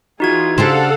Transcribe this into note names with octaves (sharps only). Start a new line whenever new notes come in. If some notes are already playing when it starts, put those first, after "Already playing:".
E3 D#4 F4 F#4 G#4 G#6
C#3 D4 G4 A4 C5 F5 F#5